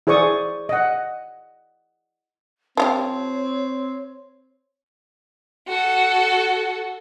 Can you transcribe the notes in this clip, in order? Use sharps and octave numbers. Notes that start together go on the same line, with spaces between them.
E4 G#4 C5 D5 C#6 D#6
D#5 F#5
F3 C4 F4 G4 C#5
F#4 A4